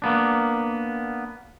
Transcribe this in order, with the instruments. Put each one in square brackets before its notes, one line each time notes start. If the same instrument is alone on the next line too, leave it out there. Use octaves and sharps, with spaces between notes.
[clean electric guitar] A#3 B3 D4